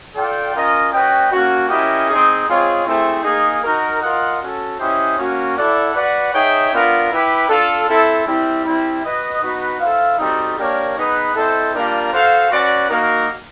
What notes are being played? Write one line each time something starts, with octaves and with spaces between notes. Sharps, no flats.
F4 A4 D5 G5
C#4 F4 A#4 D#5
C#4 F#4 B4 D#5 G5
A#3 C#4 F#4
C#4 E4 G4 A#4 D#5
C4 D#4 G#4
G#3 C4 F4 G#4 C#5
A3 C4 E4 G#4 C5
A#3 D#4 G#4
D#4 F#4 A#4
F4 A#4 D#5 F#5
C#4 F#4 A4
C#4 E4 G4 C5 D#5
A#3 C#4 F#4
E4 A4 D5 F#5
F#4 B4 D5 F#5
D#4 G#4 C#5 E5 G5
B3 D4 F4 A#4
E4 G4 B4
D4 F4 A4
C4 E4 A4
G3 C4 E4
G3 C4 E4
F#4 B4 D#5
B3 D#4 F#4 B4
E4 A4 C5 F5
G3 C4 D#4 F#4 A4
A#3 D4 G4 A#4 C#5
B3 D#4 G#4 B4
C4 E4 A4 C5 D#5
G3 A#3 D4 F4 A#4
F#4 A4 C5 F5
C#4 F#4 B4 D5 F#5
A#3 D#4 F#4 A#4